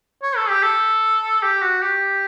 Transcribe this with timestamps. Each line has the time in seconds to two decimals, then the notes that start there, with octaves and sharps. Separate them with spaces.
0.23 C#5
0.36 A4
0.49 G4
0.63 A4
1.43 G4
1.62 F#4
1.82 G4